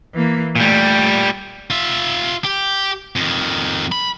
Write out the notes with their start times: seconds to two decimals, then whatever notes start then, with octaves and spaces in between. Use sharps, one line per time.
0.14 E3 A#3
0.56 A#2 G3 A3
1.70 F4 E5
2.44 G4
3.16 F2 D#3
3.92 B5